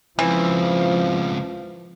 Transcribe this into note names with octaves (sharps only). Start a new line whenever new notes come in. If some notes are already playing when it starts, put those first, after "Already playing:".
C#2 E3 F3 C4